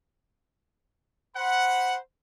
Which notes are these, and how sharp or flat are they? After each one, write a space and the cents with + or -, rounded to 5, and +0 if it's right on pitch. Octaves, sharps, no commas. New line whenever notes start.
C5 +0 F#5 +0 B5 -10